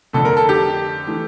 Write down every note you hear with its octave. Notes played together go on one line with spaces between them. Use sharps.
F2 D3 A3 A4
A#4
A4
G4
E3 A3